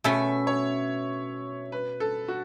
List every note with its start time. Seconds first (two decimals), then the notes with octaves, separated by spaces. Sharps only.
0.04 B2 A3 C#4 E5
0.47 C#5
1.72 B4
2.00 A4
2.28 F#4